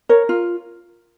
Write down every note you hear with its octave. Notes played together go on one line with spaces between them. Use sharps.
A#4 C#5
F4